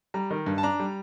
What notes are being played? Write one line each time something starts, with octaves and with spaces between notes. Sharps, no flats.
G3 A#5
D#3
G2
A5
D4 A#5
G3